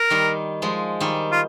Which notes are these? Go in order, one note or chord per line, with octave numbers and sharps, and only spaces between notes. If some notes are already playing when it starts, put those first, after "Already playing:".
Already playing: A#4
D#3 G3
F3 G#3
D#3 G3
F4